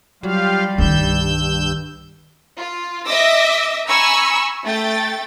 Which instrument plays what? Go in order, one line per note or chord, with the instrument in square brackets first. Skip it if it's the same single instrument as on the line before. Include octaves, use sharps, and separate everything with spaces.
[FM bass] F#3 [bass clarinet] G3 [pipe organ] F4 G4 F5
[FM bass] C2 [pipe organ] G2 E6 G6 [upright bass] D3 D#3
[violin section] F4
D#5 E5 D6 E6 A#6
G#5 A#5 B5 C#6 E6
A3 G5 A6